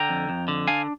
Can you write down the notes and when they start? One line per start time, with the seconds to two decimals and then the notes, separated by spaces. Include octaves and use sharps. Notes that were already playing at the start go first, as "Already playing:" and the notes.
Already playing: D3 G5 A#5
0.09 F2
0.29 F2
0.48 D3
0.68 D4 F5 G#5